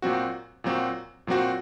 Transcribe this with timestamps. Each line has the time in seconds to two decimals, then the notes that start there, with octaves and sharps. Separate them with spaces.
0.02 A#2 F#3 C4 F#4
0.64 A#2 F#3 C4 F#4
1.27 A#2 F#3 C4 F#4